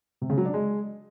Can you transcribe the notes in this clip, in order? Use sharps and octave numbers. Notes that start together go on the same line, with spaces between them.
C3
C#3
F#3
D4
G#3